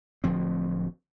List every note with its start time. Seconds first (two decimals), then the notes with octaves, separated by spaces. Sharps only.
0.24 D1 D2 F3 C4